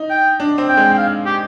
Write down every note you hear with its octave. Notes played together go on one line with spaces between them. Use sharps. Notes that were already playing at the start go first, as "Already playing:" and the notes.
Already playing: D#4
G5
D4
C4
G5
G#3
G5
F5
G4